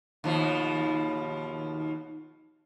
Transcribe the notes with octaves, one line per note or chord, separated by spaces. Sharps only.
D#2 B2 F3